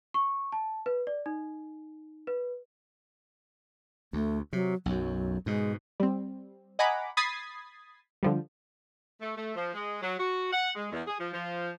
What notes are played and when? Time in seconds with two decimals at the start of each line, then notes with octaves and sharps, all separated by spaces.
0.14 C#6
0.52 A5
0.86 B4
1.07 D5
1.26 D#4
2.27 B4
4.13 D2 A3
4.53 C3 F#3
4.86 B1 F#2 F#3
5.46 G#2 B2 G#3
6.00 G3 C4
6.79 D#5 F#5 G#5 A#5 B5 D6
7.17 B5 D#6 G#6 A6 B6 C7
8.23 D3 F3 G3
9.21 A3
9.37 A3
9.55 F3
9.74 G#3
10.02 F#3
10.18 F#4
10.51 F#5
10.75 G#3
10.91 E2
11.07 G#4
11.19 F3
11.33 F3